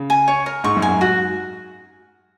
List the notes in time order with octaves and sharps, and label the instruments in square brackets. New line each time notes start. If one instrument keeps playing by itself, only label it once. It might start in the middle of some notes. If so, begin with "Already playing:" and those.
Already playing: [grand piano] C#3
[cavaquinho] G#5
C#5
A#4
[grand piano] G#2 [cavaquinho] C#6
[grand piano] F#2
[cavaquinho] G#5
[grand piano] F#2
[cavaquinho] F#4